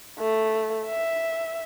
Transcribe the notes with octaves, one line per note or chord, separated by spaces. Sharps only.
A3
E5